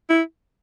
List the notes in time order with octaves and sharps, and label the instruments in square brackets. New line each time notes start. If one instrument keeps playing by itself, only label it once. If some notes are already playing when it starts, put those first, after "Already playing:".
[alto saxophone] E4